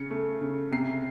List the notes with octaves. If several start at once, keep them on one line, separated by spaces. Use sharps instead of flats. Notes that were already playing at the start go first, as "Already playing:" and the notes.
Already playing: C#3 C#7
A3
C#3
C3 C7